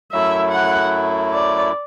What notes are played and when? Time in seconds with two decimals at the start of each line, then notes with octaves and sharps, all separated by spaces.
0.12 F#2 F#3 A3 E4 E5
0.52 F#5
1.33 D5